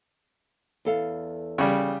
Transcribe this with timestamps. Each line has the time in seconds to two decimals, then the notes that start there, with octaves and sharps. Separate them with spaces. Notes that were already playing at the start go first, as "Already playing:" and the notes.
0.85 E2 A4 F5
1.58 C#3 G3